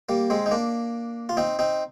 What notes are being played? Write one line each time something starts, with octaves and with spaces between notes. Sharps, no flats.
G3 A#3
G#3 C4
D#4
A#3 D4
F4
C4 D#4
C4 D#4